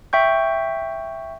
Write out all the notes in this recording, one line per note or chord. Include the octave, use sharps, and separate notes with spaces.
E5 G5 C#6 G6